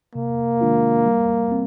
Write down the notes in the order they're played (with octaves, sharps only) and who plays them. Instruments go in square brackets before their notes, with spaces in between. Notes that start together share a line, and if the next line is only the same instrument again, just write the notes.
[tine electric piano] C3 [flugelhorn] A#3
[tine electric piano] D#3 G#3 D4 F4
G3
C4